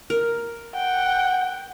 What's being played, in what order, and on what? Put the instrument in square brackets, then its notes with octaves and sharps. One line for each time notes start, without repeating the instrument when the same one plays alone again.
[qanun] A#4
[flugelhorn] F#5 [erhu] G5